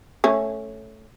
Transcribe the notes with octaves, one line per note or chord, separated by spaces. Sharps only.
A3 C#4